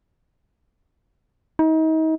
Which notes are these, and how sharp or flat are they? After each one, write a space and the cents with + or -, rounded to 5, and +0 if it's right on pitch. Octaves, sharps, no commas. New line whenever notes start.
D#4 +35